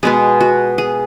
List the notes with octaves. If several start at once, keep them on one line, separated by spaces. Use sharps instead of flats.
B2 G#3 B3 G#4
F#4
G#4